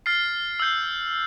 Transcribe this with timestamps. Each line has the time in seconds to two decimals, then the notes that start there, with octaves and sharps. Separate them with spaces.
0.06 F6 A6 C7
0.60 E6 G6 C7